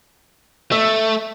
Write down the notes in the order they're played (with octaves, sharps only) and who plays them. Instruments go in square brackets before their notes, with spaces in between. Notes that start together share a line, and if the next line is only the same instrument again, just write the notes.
[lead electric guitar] A3 [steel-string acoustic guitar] E5